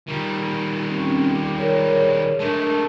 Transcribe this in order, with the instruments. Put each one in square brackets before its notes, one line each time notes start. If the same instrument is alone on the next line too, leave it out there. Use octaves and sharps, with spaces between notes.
[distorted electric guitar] D#3 G3
[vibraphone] C4 C#4
D6
G#4 A#4 C#5
[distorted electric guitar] G#3 A3 [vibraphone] D4 A#4 A5